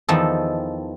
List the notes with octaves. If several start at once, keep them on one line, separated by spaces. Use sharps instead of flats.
E2 D#3 F3 A4